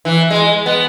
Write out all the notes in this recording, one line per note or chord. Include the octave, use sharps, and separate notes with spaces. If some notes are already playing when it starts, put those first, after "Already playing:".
E3
G#3
B3